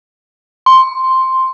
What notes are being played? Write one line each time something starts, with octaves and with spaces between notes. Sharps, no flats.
C6